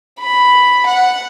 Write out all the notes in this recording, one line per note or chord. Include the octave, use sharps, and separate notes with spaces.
B5
F#5